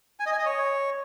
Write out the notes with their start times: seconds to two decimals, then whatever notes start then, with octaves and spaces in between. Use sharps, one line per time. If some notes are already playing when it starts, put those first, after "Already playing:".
0.20 G#5
0.26 D#5
0.33 G#5
0.39 D#5
0.46 C#5